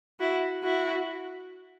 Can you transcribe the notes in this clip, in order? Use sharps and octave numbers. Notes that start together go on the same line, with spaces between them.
E4 F#4
E4 F#4